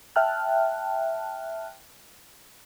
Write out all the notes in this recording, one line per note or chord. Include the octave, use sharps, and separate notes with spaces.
E5 G5 A5 F6 F#6